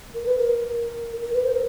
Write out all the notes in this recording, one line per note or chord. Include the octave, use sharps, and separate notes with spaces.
A#4
B4
A#4
A#4
B4
C5
A#4